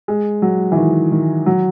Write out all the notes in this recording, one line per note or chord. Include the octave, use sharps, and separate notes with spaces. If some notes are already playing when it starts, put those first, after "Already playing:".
G#3
F#3
E3
D#3
D#3
F#3